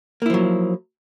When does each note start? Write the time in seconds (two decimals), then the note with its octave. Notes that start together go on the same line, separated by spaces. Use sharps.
0.22 A#3
0.26 E4
0.30 F3
0.34 F#3